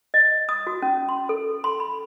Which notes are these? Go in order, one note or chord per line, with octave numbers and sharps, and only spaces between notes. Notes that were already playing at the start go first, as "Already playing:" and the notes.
D#5
D#6
F#4
C#4
C6
A4
C6
B5